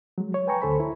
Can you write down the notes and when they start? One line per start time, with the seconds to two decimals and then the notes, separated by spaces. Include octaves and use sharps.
0.18 F#3 G#3
0.34 C#5
0.47 B4 G5 G#5 A#5 C#6
0.62 D2 D3 A4 C5 B5
0.80 E4